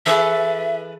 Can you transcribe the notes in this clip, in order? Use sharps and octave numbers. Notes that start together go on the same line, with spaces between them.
E3 G#4 A4 B4 E5 C#6 E6